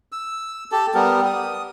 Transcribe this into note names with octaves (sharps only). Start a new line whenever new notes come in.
E6
G4 A4 A5
G3 B3 G4 A#4
D#6